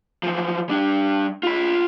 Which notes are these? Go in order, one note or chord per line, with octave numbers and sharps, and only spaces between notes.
E3 F3
G3 D4
F4 B5